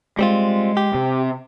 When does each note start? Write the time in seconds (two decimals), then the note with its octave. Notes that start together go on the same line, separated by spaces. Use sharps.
0.19 G3 G#3 C4 F4
0.77 G4
0.94 C3